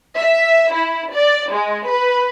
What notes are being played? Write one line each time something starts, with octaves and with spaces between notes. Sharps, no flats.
E5
E4
D5
G#3
B4